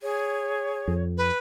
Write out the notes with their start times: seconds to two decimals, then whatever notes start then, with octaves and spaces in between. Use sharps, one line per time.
0.02 G#4 C#5
0.88 F2
1.18 B4